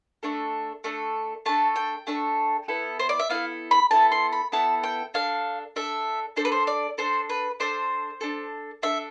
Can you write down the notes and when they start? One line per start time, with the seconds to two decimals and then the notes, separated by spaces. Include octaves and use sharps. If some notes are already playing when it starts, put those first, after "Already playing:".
0.23 A3 D4 A4
0.84 A3 D4 A4
1.46 A3 D4 A4 A5
1.76 G5
2.07 A3 D4 A4
2.68 B3 E4 A4
2.99 C5
3.09 D5
3.19 E5
3.29 B3 E4 A4 F5
3.71 B5
3.91 B3 E4 A4 A5
4.12 C6
4.33 B5
4.52 B3 E4 A4 A5
4.83 G5
5.14 D4 A4 F5
5.76 D4 A4 E5
6.37 D4 A4 C5
6.45 B4
6.52 C5
6.67 D5
6.98 D4 A4 C5
7.29 B4
7.60 D4 A4 C5
8.21 D4 A4
8.83 D4 A4 E5